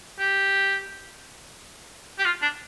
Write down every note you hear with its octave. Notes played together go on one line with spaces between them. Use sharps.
G4
G4
F4
D4